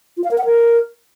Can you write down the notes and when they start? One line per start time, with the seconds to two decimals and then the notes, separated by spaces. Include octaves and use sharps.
0.17 F4
0.24 F5
0.31 A#4
0.38 F#5
0.45 A#4